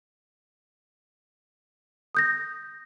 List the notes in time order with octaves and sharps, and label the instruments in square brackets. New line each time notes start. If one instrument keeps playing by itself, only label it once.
[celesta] D#6 G6 A#6